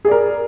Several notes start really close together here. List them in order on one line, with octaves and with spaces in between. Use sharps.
G#4 D5 A#4